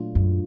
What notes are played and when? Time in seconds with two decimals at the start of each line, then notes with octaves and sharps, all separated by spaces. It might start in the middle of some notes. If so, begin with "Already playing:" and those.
Already playing: A#2 F#3 A3 D4 F4
0.15 F#2